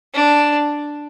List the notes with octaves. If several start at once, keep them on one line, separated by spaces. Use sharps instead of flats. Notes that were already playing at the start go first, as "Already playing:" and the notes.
D4